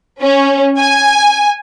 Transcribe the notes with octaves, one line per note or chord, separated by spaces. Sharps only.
C#4
G#5